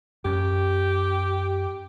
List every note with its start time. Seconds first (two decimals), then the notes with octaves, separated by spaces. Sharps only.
0.25 F#2 G4